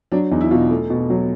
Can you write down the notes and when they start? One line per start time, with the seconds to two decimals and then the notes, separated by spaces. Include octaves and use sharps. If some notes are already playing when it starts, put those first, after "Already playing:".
0.12 F#3 D4
0.31 E2 D#4
0.41 E4
0.51 B2 F4
0.70 A3
0.90 B2
1.10 F#3